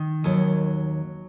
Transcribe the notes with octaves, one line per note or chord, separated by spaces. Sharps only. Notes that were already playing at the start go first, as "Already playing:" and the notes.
Already playing: D#3
D#2 F#3